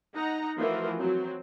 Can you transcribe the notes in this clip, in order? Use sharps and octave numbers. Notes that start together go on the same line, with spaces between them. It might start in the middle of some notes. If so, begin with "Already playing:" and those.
D#4 F#5 A#5
E3 F3 A3 F#4 A#4
F#3 C4